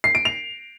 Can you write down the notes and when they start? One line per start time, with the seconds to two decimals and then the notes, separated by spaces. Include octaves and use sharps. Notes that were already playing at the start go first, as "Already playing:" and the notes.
0.04 C7
0.15 D7
0.25 F7